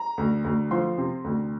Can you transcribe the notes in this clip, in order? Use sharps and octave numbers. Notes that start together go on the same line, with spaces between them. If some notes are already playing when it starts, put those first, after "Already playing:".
Already playing: A#5
D2
D2
F3 C6
C3
D2